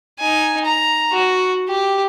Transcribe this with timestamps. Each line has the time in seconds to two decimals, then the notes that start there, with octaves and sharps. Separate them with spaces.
0.19 D#4 G#5
0.66 A#5
1.12 F#4
1.68 G4